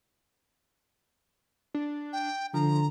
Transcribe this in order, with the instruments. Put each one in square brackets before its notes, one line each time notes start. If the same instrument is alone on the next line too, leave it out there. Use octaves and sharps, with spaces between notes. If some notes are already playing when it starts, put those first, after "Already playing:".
[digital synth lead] D4
[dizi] G5
[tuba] D3 [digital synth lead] F3 [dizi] A#5